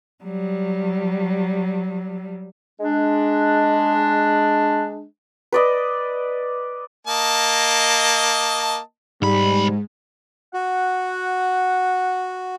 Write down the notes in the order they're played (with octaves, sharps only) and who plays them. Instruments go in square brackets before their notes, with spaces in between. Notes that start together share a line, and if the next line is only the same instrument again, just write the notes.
[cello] F#3 G3
[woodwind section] G#3 D4
[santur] B4 D5 D#5
[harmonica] A#3 D#5 A5
[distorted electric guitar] B1 B5 [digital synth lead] G#2 [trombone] G3
[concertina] F#4 [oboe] F#5